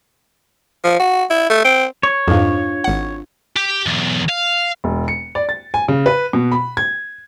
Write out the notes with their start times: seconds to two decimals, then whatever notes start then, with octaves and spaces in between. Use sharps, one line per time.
0.84 F3
1.00 F#4
1.30 E4
1.50 A3
1.65 C4
2.03 C#5
2.28 F2 G#2 D4 F4 F5
2.84 G#1 F#5
3.57 G4
3.86 B1 E2
4.29 F5
4.84 E1
5.08 C#7
5.35 D5
5.49 A6
5.74 G#5
5.88 C#3
6.06 B4
6.33 B2
6.52 B5
6.77 G#6